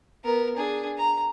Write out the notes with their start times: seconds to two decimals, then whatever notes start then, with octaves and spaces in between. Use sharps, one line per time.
0.24 B3 A#4
0.57 D4 G#4
0.98 A#5